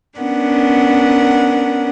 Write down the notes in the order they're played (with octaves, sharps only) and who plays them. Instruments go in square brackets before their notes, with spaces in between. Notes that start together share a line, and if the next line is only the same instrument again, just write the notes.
[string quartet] B3 C#4 D4 A#4 F#5